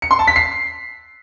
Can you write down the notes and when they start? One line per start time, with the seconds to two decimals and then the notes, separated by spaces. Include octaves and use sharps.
0.02 C#7
0.11 C6
0.19 A5
0.28 B6
0.36 C7